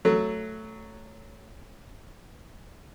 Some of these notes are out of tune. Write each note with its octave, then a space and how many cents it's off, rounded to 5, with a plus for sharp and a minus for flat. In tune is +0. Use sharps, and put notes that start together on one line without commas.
F#3 +0 A3 +0